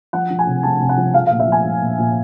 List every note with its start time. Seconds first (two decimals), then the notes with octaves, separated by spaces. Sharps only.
0.13 F3 F#5
0.30 F3
0.39 G#5
0.47 C3
0.63 F3 A5
0.81 C3
0.89 F#5
0.97 F3
1.14 F3 F5
1.27 F5
1.31 A#2
1.40 E5
1.47 F3 G#5
1.65 F3
1.81 A#2
1.99 A#2